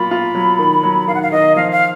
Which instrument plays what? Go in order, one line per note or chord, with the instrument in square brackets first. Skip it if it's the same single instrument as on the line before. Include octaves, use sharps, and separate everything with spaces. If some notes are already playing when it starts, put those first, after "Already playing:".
Already playing: [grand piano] F#3 A#3 F4 [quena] B5
[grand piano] F4
F#3
D#3
F#3
[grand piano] D#3 [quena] F5
[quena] F#5
F5
[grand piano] D#3 [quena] D#5
[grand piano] F3 [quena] F5
[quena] F5